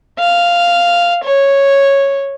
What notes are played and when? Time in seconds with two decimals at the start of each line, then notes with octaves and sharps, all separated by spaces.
0.19 F5
1.24 C#5